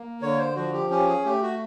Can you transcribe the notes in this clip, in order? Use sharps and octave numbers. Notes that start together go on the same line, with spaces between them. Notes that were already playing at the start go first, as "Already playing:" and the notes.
Already playing: A#3
D3 C#5
C5
F3 F#4
G4
C#4 G4
G#4
A3 G4
F#4